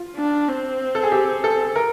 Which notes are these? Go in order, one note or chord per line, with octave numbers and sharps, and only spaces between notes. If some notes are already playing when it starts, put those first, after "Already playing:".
Already playing: F4
D4
C4
A4
G#4
G4
A4
A#4